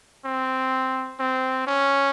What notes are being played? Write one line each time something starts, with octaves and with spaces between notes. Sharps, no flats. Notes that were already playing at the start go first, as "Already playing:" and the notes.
C4
C4
C#4